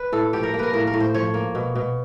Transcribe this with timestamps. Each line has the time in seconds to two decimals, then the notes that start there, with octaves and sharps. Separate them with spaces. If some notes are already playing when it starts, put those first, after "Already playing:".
Already playing: B4
0.12 A2 A4
0.33 F3 G4
0.43 A#4
0.54 A#3
0.59 A#4 B4
0.73 A2 A#4
0.87 A#4
0.94 A2
1.00 C5
1.14 F3 C#5
1.34 A#3
1.55 B2
1.75 B2